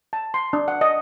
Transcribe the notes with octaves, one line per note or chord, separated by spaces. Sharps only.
A5
C6
D4
F#5
D#5